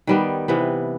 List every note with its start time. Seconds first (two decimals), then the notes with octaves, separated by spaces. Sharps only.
0.07 D#3 G3 B3
0.48 C3 E3 B3